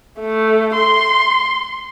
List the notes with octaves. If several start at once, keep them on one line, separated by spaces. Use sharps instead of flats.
A3
C6